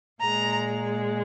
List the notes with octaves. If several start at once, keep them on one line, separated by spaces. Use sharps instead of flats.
A#2 G#3 A#5